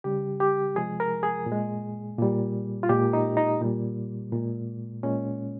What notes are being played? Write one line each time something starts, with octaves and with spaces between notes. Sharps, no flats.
C#3 G3 G4
G4
C3 F3 G#3 G#4
A#4
G#4
A#2
G#3
A#2 G3
F4
A#2 G#3 G4
D#4
D#4
A#2 G3
A#2 G#3
A#2 G#3 C#4